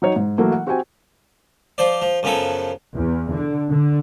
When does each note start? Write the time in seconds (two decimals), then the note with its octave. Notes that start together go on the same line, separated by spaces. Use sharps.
0.02 F#3 D#4 C#5
0.16 G#2
0.38 E3 F#3 A3 A#3
0.52 F#5
0.66 C4 F#4 G4 C5 G5 G#5
1.78 F3 C5 D5
2.02 F3
2.23 F#2 C#3 F3 B3 A4
2.95 E2
3.33 D3
3.71 D3